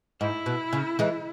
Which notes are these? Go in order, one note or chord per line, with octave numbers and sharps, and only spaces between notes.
G#2 E4
B2
C#3
E3 G#3